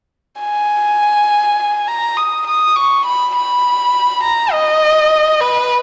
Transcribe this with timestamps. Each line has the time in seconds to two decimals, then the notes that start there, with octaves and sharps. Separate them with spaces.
0.41 G#5
1.87 A#5
2.17 D#6
2.47 D#6
2.76 C#6
3.06 B5
3.35 B5
4.23 A#5
4.52 D#5
5.40 B4